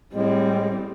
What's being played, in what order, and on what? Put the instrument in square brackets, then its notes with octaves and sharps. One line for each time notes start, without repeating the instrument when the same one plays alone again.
[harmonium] A2 G#3 [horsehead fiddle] G3 C4